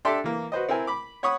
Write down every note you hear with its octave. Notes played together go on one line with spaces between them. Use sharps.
D4 G4 A4 E5 C6
E3 A#3
F#4 B4 C5 D#5
C4 E4 A#4 G#5
B5 D6
C#5 F#5 B5 C#6 D#6